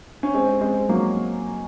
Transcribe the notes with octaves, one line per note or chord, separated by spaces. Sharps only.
C#4
G#3 C4
G#3 C4
F#3 A#3